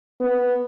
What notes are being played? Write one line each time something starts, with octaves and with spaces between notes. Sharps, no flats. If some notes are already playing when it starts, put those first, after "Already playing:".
B3